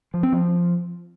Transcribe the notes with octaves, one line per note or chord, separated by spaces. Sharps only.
F3
C4
F3